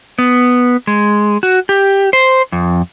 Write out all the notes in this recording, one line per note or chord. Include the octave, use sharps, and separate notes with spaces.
B3
G#3
F#4
G4
C5
F2